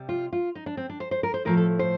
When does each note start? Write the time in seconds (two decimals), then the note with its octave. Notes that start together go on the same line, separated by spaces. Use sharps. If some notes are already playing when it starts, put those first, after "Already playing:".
Already playing: C3 G3
0.09 F4
0.33 F4
0.55 D#4
0.66 D4
0.77 C4
0.90 D4
1.00 C5
1.11 C5
1.23 A#4
1.34 C5
1.45 A2 F3 A3 A#4
1.57 A4
1.79 C5